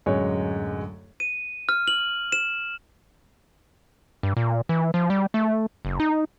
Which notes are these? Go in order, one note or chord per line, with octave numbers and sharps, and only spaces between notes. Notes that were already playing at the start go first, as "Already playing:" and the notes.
D1 F#2 F#3 G#3 C#5
D#7
F6
F#7
E7
G2
A#2
E3
F3
G3
A3
F#1
D#4